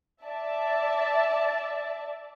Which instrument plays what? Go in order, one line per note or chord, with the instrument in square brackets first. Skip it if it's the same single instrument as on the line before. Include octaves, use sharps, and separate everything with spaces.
[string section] D5 E5 A5